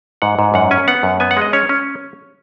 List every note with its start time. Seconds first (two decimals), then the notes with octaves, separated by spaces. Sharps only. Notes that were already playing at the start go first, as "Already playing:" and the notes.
0.22 G#2 F#5
0.39 G#2
0.54 F#2 F#5
0.71 C#4 G#5
0.88 B3 F#5
1.03 F#2
1.20 B3 G#5
1.31 F#5
1.37 G#3 D#5
1.53 C#4 C#5
1.69 C#4